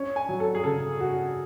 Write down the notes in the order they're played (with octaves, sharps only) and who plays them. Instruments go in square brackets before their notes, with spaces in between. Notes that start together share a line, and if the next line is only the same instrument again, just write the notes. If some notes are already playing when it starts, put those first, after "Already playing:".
Already playing: [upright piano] C#4 [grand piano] C#5
[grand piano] G#5
[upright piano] F#3
[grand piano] A4
G#4
[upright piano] C#3 [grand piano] A4
[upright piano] F#4